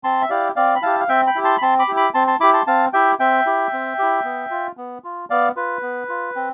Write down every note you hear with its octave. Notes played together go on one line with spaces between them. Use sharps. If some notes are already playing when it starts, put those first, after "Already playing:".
C4 A5 C6
E5
E4 G4 D5 F5
C4 D5 F5
B5
E4 G4 F5 A5
F5
C4 E5 G5
G5 B5
E4 G4
A5 C6
B5
C4 A5 C6
B5 D6
E4 G4
B5 D6
C4 A5 C6
A5 C6
E4 G4 B5 D6
A5 C6
C4 F5 A5
E4 G4 E5 G5
C4 E5 G5
E4 G4
C4
E4 G4
B3
F4
B3
F4
B3 D5 F5
F4 B4
B3
F4
C4